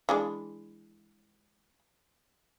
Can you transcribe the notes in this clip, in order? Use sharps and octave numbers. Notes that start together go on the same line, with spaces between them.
E3 G#3 D4